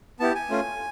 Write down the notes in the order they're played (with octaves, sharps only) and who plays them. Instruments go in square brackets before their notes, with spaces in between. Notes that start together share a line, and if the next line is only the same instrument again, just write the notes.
[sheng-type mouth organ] B3 E4 G4 A5
G#5
A3 C#4 F4